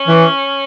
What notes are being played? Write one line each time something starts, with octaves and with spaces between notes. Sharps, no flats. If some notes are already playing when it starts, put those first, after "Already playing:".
Already playing: C#4
E3